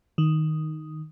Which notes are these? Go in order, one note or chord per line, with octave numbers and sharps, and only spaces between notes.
D#3